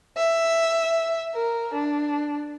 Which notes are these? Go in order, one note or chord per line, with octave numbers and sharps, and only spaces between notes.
E5
A#4
D4